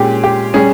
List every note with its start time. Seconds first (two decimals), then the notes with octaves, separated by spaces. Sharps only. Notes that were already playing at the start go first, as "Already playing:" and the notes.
Already playing: A#2 G#3 C#4 G4 G#4
0.24 G4
0.54 G3 C#4 G#4